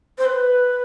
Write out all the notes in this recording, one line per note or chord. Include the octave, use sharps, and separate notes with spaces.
C5
B4